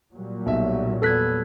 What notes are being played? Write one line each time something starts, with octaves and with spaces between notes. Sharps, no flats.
A#2 F#3 G3
B1 E5
E2 B3 A4 F#6 G#6 B6